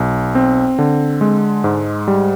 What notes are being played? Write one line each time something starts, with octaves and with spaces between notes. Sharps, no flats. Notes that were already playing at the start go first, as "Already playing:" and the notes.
Already playing: B1
C4
D3
G#3
G#2
G3